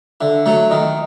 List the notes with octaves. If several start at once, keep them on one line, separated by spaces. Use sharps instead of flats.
D3 E5
F#3 A3
D#3 D#5